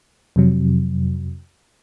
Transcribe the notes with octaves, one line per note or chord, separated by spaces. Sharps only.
F2 C3 F#3